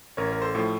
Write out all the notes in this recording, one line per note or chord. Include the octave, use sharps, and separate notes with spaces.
A1 A#4 C#5
A#4
A4 C5
A2 F3 A3